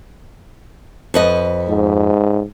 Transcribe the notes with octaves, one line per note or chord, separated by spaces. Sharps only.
F2 B4 D#5
G#2